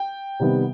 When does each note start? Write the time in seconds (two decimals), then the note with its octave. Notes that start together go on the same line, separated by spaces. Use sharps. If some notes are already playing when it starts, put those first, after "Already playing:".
Already playing: G5
0.39 C3 D#3 G3 B3